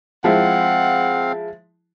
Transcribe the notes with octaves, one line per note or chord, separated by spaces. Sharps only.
F3 G#3 C4 E4 F5 F#5